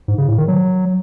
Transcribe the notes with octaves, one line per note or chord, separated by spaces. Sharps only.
G#2
C#3
A2
D#3
F#3